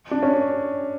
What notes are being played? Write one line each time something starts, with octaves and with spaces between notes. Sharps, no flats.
D4
C#4